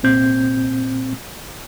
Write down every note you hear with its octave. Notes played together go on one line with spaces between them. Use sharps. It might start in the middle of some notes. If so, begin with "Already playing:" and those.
C2 A#2 C4 G6